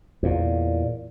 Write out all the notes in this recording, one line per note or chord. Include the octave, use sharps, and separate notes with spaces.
E2 A#2